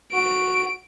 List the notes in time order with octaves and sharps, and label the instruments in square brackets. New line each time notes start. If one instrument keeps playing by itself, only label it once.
[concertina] F#4 [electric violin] D7